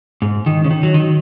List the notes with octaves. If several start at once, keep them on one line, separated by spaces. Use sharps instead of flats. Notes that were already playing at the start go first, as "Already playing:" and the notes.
G#2
D#3
C#3
D#3
F#3
D#3